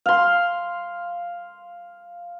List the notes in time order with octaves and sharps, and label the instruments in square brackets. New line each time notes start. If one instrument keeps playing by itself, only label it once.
[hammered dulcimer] F5 C6